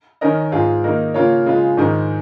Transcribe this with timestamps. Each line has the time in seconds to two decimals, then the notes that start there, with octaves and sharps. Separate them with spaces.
0.21 D#3 C#4 A#4 D#5
0.52 G#2 G#3 F4 G#4
0.84 D#3 A#3 D#4 A#4
1.14 C#3 A#3 F4 A#4 C#5
1.46 C#3 G#3 F4
1.77 G#2 D#3 G#3